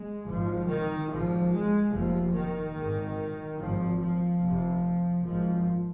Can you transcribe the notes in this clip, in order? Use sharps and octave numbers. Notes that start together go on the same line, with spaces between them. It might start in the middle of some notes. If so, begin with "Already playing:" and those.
Already playing: G#3
G#1 G#2 F3
D#3
G#1 G#2 F3
G#3
F1 D#2 F3
D#3
G#1 G#2
G#1 G#2 F3
F3
F1 F2 C3
G#1 G#2 F3